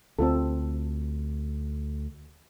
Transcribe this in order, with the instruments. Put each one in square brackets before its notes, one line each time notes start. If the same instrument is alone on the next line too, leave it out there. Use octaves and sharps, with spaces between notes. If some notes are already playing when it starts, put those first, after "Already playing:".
[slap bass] D2 [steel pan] C4 F4 A4